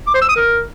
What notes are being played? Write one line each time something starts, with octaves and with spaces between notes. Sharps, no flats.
D6
C5
E6
D#6
A#4